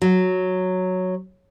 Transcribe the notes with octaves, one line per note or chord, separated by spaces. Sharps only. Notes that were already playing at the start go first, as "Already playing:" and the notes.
F#3